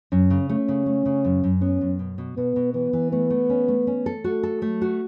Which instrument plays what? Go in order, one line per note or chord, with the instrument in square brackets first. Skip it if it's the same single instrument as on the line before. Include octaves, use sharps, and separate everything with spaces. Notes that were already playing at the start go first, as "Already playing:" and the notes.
[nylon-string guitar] F#2 [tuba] C#4
[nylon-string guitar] C#3
[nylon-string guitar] A3 [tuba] C#4
[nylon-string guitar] C#3
A3
C#3
F#2
F#2
[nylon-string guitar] B3 [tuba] C#4
[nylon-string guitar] F#2
B2
B2
[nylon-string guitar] B2 [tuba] B3
[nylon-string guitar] B2
[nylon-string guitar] E3 [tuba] B3
[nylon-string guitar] E3
[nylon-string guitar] A3 [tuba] B3
[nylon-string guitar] A3
C#4
A3
C#4
A4
[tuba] A3 [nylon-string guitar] F#4
[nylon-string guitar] A4
[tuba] F#3 [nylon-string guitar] A3
[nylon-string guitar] F#4